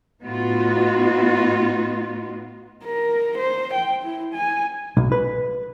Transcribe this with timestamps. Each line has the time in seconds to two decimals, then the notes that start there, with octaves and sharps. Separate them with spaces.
0.22 A2 B3 D#4 F4 F#4
2.84 A#4
3.38 C5
3.74 G5
4.03 E4
4.34 G#5
4.97 B1
5.12 B4